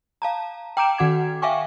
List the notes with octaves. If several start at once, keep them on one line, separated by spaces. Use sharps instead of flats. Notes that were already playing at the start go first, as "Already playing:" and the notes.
F5 A5 A#5
G5 A#5 D6 G6 D7 E7
D#3 F#4 F#5 D6 G#6
E5 F5 G5 G#5 C#6 D6